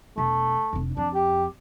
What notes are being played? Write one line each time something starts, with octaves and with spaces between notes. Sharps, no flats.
E1 A3
F1 D4
F2 D4
G4